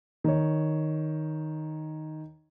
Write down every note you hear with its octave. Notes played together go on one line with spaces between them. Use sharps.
D#3 C#5